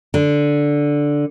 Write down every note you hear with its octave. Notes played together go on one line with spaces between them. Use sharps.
D3